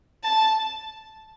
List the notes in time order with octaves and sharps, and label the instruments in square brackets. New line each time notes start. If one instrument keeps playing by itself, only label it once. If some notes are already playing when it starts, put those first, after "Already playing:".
[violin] A5